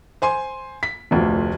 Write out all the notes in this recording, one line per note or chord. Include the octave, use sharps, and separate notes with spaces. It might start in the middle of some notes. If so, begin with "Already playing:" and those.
C5 G#5 C6
B6
F1 D2 F3